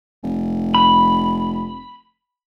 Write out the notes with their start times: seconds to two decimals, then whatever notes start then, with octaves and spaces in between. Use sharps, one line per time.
0.24 F1
0.74 B5